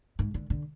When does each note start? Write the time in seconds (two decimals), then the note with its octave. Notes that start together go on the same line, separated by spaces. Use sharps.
0.19 G#2
0.34 D3
0.50 D3